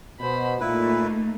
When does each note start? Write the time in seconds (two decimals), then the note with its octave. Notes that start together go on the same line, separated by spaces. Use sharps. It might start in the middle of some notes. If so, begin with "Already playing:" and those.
0.20 B2 C5 B5
0.61 A#2 A3 A#3 D#4 E4 B4